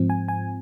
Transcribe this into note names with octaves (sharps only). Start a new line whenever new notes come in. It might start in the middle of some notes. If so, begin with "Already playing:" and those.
Already playing: G#2 F3 C4
G#5
G#5